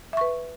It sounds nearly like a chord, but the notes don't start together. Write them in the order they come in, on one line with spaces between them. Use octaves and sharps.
E5 C#6 B4